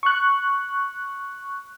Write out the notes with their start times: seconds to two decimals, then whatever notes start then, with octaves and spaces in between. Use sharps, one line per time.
0.03 C#6 F#6